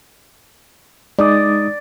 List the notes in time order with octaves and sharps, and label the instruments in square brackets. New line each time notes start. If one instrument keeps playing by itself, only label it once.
[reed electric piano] G#3 D#4 D#6 [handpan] D5